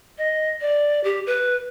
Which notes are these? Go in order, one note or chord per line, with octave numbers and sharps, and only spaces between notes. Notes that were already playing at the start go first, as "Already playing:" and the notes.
D#5
D5
G4
B4